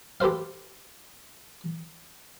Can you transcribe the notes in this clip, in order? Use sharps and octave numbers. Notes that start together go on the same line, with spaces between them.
G4 A4 B4 C5 F5